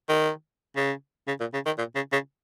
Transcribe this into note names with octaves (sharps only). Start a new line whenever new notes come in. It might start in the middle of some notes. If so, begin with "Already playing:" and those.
D#3
C#3
C#3
A#2
C#3
D#3
A#2
C#3
C#3